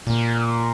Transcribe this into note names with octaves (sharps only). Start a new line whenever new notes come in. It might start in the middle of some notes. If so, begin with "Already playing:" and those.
A#2